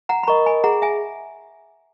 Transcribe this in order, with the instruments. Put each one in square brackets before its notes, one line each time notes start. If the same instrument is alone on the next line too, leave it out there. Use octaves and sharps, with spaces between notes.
[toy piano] F#5 A#5
B5
[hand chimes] A#4 D#5 [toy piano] A#5 C#6
[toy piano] G#5 B5
[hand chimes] G#4 [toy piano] F#5 A#5
[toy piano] E5 G#5